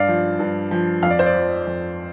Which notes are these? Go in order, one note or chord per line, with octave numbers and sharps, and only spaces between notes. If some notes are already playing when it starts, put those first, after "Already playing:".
Already playing: G2 D5 F5
F3
G2
F3
F2 F5
D5
C5
D5
F3
F2